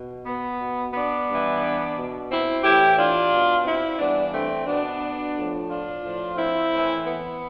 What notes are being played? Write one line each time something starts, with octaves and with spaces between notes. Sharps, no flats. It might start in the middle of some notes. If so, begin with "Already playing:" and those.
Already playing: B2
B3
B2
B3 D4
G2 E3
B2
C4 E4
A2 E3 E4 G4
D4 F4
B2
C4 E4
G2 E3 B3 D4
A3 C4
B2 B3 D4
A2 F3
D4 F4
A2 F3
C4 E4
A2 E3
B3